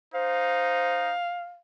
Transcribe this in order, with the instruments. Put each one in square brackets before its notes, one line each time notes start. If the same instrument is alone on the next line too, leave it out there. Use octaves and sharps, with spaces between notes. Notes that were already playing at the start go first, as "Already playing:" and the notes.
[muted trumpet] D#4 [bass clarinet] C5 [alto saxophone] F5